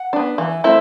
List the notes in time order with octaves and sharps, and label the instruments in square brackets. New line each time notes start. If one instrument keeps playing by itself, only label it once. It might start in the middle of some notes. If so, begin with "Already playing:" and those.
Already playing: [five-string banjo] F#5
B3 D4
E3
A3 C4 E4